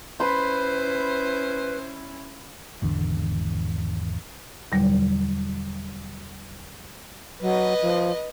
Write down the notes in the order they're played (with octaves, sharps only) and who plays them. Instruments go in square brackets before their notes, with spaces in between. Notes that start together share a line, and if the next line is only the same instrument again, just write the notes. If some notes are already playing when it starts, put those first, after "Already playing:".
[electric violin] C#4 E4 [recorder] B4 [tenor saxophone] C5 [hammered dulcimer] B5 C6
[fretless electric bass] G#1 E2 D3
[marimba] E2 B2 D3 F#3 G3
[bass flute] F#3 [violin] B4 D#5
[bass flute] F3